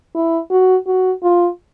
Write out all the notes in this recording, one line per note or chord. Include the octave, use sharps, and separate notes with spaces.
E4
F#4
F#4
F4